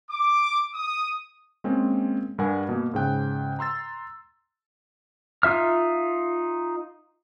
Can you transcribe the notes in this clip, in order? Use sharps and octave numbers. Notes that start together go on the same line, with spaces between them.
D6
D#6
G#3 A#3 C4 C#4
G2 G3 A#4 F#5 G#5
B2 A#3
G#2 C#3 G5 F#6
A#5 C6 E6 A6
D#4 F4 E5 F6